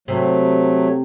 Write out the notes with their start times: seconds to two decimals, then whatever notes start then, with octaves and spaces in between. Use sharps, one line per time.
0.08 C3 F#3 A3